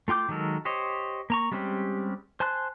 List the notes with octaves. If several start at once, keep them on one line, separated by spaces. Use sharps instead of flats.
A3 F4 G5 D6 G6
D#3 F#3 G#3 A4 A#4
G4 C5 C#5 D#5
A#3 A#5 C#6
G3 G#3 C4 C#4 G4
C5 G#5 A5 C6 F#6